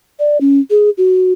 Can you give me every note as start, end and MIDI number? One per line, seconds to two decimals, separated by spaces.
0.19 0.38 74
0.41 0.60 61
0.70 0.90 68
0.98 1.33 66